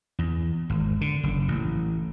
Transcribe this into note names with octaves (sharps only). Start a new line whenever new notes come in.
E2
G#1
D3
F#1
A1